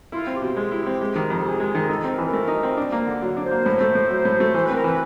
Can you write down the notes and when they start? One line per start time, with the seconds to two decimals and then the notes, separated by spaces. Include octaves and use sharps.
0.12 E4 F4
0.27 C4
0.34 G4
0.42 B2
0.56 G#3
0.71 E4
0.86 C4
1.01 G#3
1.16 D#3
1.30 F2
1.40 A4
1.45 C3 G#4
1.60 G#3
1.75 D#3
1.81 G#4
1.89 D#4 A4
2.04 C4
2.11 A#4
2.18 E3 B4
2.26 A#4
2.33 A3
2.47 D#4
2.63 C4
2.77 D4
2.92 A#3
3.07 D3
3.22 F#3
3.37 D4
3.44 C5
3.51 A#3
3.66 A2
3.80 A3
3.95 A2
4.11 F#3
4.25 A2
4.40 A3
4.54 E3 C5
4.65 C4 B4
4.75 A#4
4.84 E3 B4